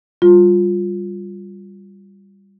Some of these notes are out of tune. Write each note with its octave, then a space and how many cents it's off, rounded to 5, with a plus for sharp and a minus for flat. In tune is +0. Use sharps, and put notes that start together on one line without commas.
G3 +5 F4 +15